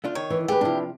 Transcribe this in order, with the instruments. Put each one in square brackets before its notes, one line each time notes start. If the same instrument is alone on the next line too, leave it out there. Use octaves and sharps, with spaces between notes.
[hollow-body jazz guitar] A3 D4 F4
[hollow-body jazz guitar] D#3 [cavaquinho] C#5
[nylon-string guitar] E3
[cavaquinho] G4 [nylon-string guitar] G#4 B4
[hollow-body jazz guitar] C3 F3 [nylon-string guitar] D4 E4